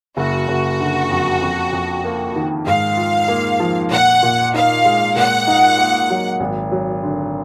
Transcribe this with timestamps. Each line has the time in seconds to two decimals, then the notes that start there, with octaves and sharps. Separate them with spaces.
0.17 F#1 F#4
0.48 F#1
0.80 D3
1.10 F2
1.42 F2
1.73 F2
2.05 A#3
2.36 D#3
2.66 G#2 F5
2.97 F4
3.28 A#3
3.60 F3
3.91 A#2 F#5
4.23 A#2
4.54 D#4 F5
4.85 G#3
5.15 A#2 F#5
5.47 D#4
5.78 A#3
6.10 F#3
6.40 G#1
6.72 F#3
7.03 D3